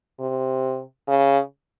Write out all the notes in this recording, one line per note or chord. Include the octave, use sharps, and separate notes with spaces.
C3
C#3